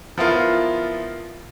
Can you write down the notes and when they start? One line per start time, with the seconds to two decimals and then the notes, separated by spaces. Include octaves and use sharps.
0.18 F3 B3 E4 F4 A#4